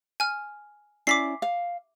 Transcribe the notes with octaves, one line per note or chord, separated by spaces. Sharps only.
G#5 F6
C#4 E4 D5 D6 B6 C7
F5